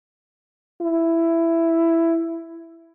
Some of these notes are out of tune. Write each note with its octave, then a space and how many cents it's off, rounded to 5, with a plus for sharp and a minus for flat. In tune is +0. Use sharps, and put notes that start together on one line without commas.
E4 +10